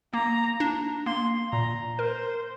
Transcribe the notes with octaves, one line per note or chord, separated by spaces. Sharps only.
A#3 A#5
D4
A#3 C6
A#2 A#5
A#4 C5